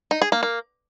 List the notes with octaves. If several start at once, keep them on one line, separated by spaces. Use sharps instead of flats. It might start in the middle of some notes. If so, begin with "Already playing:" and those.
D#4
G#4
A#3
A#3